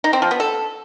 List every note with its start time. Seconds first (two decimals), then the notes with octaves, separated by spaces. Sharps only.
0.04 D#4
0.13 C4
0.22 F3
0.31 B3
0.40 A4